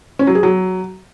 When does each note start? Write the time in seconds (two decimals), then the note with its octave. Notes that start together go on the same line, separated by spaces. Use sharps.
0.19 C#4
0.27 F#3
0.35 G#4
0.43 F#3